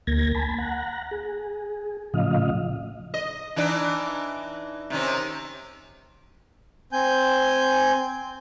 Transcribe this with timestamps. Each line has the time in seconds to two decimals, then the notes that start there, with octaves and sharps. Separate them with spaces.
0.07 D2 A#3 G#6 A#6
0.35 G#5 A5 B5
0.58 F#5 A#5
1.11 G#4
2.14 A2 C#3 F3 D#5 F5
3.14 D#5
3.56 E3 D4 D#4
4.90 C3 D#3 C#4
6.93 C4 G#5 G6